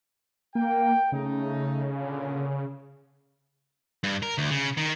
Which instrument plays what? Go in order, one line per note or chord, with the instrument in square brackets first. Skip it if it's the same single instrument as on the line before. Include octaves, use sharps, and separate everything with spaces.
[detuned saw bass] A#3 [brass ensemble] G5
[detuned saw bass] C#3 [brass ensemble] A3 D#4
[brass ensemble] A#2 D3
[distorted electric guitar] G2
A#4
D2
C#3
D#3